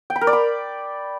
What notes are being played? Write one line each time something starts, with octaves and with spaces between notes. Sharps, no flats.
G5
B5
A#4
D5
B5